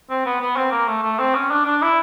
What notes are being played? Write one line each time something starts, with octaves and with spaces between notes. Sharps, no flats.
C4
B3
B3
C4
A#3
A3
A3
C4
C#4
D4
D4
E4